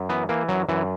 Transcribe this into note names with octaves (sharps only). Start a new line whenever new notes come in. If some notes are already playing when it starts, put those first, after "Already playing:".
Already playing: F#2
E3 B3
E3 A#3
F#2 F#3
F#2 E3